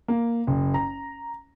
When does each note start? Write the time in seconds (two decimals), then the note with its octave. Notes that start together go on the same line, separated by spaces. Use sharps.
0.08 A#3
0.47 F#1
0.74 A#5